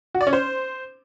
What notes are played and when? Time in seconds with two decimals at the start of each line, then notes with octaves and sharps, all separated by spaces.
0.15 F#4
0.21 D5
0.27 C#4
0.33 C5